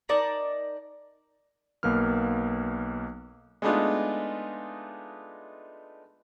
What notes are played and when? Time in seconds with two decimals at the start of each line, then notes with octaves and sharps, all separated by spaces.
0.09 D#4 A#4 D5 A5
1.83 B1 A#3 B3 F6
3.62 G#3 A3 B3 D4 D#4 F4